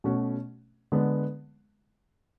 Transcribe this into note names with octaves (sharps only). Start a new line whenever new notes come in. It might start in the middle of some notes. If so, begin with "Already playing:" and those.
B2 A3 C#4 F#4
D3 G#3 B3